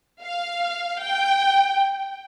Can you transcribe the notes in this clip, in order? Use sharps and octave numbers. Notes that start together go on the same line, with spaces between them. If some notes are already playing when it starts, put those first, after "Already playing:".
F5
G5